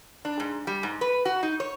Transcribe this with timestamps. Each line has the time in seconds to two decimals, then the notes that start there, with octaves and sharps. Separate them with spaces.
0.25 D4
0.40 G#2
0.67 G3
0.83 G#2
1.01 B4
1.25 F#4
1.43 D#4
1.60 C#5